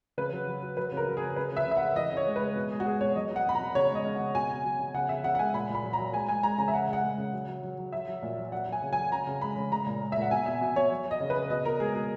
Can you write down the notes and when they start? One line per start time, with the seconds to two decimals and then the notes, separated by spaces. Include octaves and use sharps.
0.18 C#3 B4
0.33 F#3
0.47 F#3
0.62 F#3
0.77 F#3 B4
0.92 C#3 A#4
1.08 F#3
1.17 G#4
1.22 C#3
1.36 C#3 B4
1.52 C#3 E5
1.66 C#3 E5
1.77 C#3 F#5
1.96 E3 D#5
2.12 C#3
2.17 C#5
2.26 G#3
2.36 B4
2.41 G#3
2.56 B2
2.71 G#3 G#4
2.80 F#4
2.86 G#3 G#4
3.01 B2 C#5
3.16 F#3 D#5
3.30 F#3
3.36 F#5
3.46 B2 B5
3.55 A#5
3.61 B2
3.75 C#3 C#5
3.90 G#3 D#5
4.05 C#3
4.15 C#3 F#5
4.35 B2 G#5
4.50 B2
4.64 F#3
4.79 B2
4.94 C#3 F#5
5.09 C#3 E5
5.24 C#3 F#5
5.35 F#5
5.39 G#3 G#5
5.54 A#2 B5
5.69 A#2
5.75 B5
5.84 F#3
5.93 A#5
5.99 F#3
6.14 G#3 G#5
6.29 G#3 G#5
6.43 G#3 A#5
6.58 C#3 A#5
6.68 E5
6.73 C#3 F#5
6.88 G#3 F#5
7.03 G#3
7.18 C#3
7.33 F#3
7.48 F#3
7.63 F#3
7.78 F#3
7.92 F#3 E5
8.08 F#3
8.22 A#2
8.37 F#3
8.52 F#3 F#5
8.67 F#3
8.72 G#5
8.82 C#3
8.93 F#3 G#5
9.11 C#3 A#5
9.27 C#3
9.41 G#3 B5
9.56 C#3
9.72 G#3 A#5
9.86 A#2
10.01 G#3
10.12 A#2 E5
10.22 F#5
10.31 B2 G#5
10.46 B2 E5
10.61 B2
10.75 B2 C#5
10.91 F#3
11.06 F#3
11.11 D#5
11.20 C#3
11.30 B4
11.35 C#3
11.50 B2 D#5
11.65 B2 A#4
11.80 G#3 G#4
11.95 B2 G#4